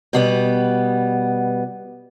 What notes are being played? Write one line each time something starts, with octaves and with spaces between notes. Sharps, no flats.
B2 G3 B3